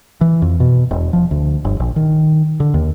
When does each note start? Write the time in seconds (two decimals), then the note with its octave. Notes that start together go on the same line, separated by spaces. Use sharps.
0.21 E3
0.42 F2
0.60 B2
0.91 E1
1.13 F3
1.31 D2
1.65 G1
1.80 A#1
1.96 D#3
2.60 D3
2.74 D#2